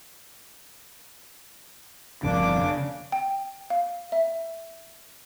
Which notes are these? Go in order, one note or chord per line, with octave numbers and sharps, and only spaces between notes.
G1 F2 C#3 A#3 D4 D6
C#3
G5
F5
E5